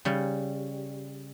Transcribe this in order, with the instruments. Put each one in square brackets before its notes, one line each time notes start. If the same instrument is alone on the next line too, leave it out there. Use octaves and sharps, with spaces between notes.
[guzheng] C#3 G3